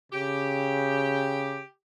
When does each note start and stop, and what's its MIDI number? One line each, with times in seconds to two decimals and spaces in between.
0.12 1.61 49
0.12 1.65 67